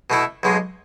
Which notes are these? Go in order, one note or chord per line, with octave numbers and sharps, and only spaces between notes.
B2 A3 E4
B1 B2 G#3